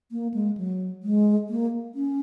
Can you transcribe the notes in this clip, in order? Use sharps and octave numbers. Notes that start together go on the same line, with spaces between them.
A#3
G#3
F#3
G#3
A#3
C#4